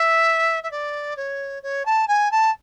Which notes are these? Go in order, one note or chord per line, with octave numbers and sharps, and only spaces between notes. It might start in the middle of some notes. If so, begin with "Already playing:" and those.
Already playing: E5
E5
D5
C#5
C#5
A5
G#5
A5